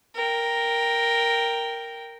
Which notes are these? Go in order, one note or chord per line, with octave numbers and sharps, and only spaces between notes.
A#4 G5